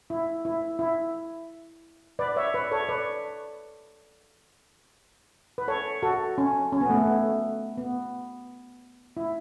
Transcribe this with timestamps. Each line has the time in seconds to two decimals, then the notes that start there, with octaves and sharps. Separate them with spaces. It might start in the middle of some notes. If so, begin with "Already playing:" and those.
0.10 E4
0.45 E4
0.79 E4
2.19 B4 D5
2.36 C#5 E5
2.54 B4 D5
2.72 A4 C#5
2.89 B4 D5
5.58 B4
5.68 A4 C#5
6.03 F#4 A4
6.38 C#4
6.72 C#4
6.81 B3
6.90 A3
6.98 B3
7.07 A3
7.78 B3
9.17 E4